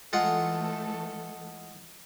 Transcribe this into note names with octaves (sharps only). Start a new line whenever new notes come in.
E3 G#3 A3 F4 A4 F#5